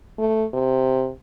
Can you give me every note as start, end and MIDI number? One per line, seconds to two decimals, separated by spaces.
0.18 0.45 57
0.54 1.10 48